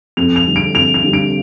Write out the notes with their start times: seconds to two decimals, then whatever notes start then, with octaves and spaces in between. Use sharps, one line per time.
0.17 F2 F7
0.36 F7
0.46 D3 G3
0.56 D7
0.75 F2 F7
0.94 F7
1.04 D3 G3
1.13 D7